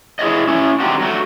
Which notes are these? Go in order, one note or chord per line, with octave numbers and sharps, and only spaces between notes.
E4 G#4 C#5 D#5
C#4 E4
C4 D4 D#4 F#4 G4
F#3 A3 F#4